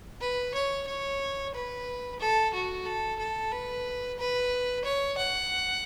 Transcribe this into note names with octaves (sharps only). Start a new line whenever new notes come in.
B4
C#5
C#5
B4
A4
F#4
A4
A4
B4
B4
C#5
F#5